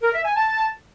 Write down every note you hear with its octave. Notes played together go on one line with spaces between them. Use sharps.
A#4
E5
G#5
A5